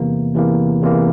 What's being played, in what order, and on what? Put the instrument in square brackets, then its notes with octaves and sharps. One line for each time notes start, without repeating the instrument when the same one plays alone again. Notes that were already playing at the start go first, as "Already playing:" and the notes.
Already playing: [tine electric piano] E2 C3 E3 A#3
E2 C3 E3 A#3
E2 C3 E3 A#3